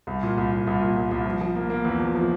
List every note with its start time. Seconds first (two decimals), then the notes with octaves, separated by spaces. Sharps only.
0.07 C2
0.23 A#2
0.38 C2
0.52 C2
0.67 C2
0.81 A#2
0.96 C2
1.11 C2
1.26 F3
1.41 F3
1.55 A#3
1.70 A#3
1.85 E2
2.00 F3
2.15 F3